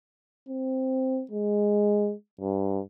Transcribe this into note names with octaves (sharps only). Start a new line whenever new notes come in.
C4
G#3
G2